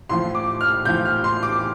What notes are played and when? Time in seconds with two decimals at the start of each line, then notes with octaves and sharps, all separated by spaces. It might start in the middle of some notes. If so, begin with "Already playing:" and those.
0.09 A2 F3 C6
0.35 D6
0.61 F6
0.85 A2 F3 G6
1.05 F6
1.24 C6
1.43 D6